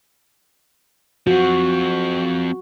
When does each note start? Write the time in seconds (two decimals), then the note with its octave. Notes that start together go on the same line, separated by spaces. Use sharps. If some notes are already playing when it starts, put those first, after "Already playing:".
1.27 F3 C4 F#4